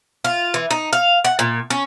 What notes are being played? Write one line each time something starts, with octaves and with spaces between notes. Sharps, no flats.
F4
E3
D#4
F5
F#5
A#2
C#4